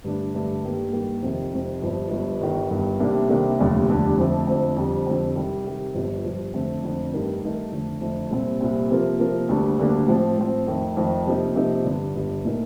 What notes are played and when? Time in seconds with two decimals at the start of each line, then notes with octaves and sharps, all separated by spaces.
0.04 G2 D3 A3 D4
0.34 G2 D3 A3 D4
0.64 G2 D#3 G3 A#3
0.93 G2 D#3 G3 A#3
1.23 F2 C3 D#3
1.52 F2 C3 D#3
1.82 G1 G2 F3
2.11 G1 G2 F3
2.41 G1 G2 D#3
2.70 G1 G2 D#3
3.00 C2 C3 D#3 A#3 D4
3.29 C2 C3 D#3 A#3 D4
3.59 F1 D#2 D3 G3 D4
3.88 F1 D#2 D3 G3 D4
4.18 F2 D3 F3 A3 C4
4.47 F2 D3 F3 A3 C4
4.77 F2 D3 G3 C4
5.07 F2 D3 G3 C4
5.36 C3 D#3 G3
5.65 C3 D#3 G3
5.94 G1 G2 F3
6.25 G1 G2 F3
6.54 F2 D3 A3 C4
6.83 F2 D3 A3 C4
7.13 G2 D#3 A3 D#4 A#4
7.42 G2 D#3 A3 D#4 A#4
7.72 F2 D3 A3
8.01 F2 D3 A3
8.31 C2 A#2 G3 C4
8.61 C2 A#2 G3 C4
8.90 C3 F3 A#3 F4 A#4
9.19 C3 F3 A#3 F4 A#4
9.49 D2 D3 G3 A#3 D4
9.78 D2 D3 G3 A#3 D4
10.08 A2 F3 C4
10.37 A2 F3 C4
10.67 F2 D#3 A3
10.97 F2 D#3 A3
11.26 C3 F3 A#3 D#4
11.56 C3 F3 A#3 D#4
11.85 G1 G2 D3
12.15 G1 G2 D3
12.45 A#2 A3 D#4 A#4